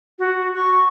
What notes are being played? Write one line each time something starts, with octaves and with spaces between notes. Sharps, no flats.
F#4
C#6